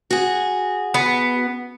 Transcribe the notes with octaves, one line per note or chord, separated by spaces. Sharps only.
F#4 G#4
B3